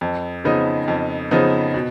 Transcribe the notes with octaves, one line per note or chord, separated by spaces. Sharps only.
F2
C#3 F3 B3 D#4
F2
C#3 F3 B3 D#4
B2